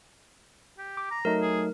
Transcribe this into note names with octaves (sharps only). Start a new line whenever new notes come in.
G4
D6
A#5
F#3 A3 D#4 A#4
G#4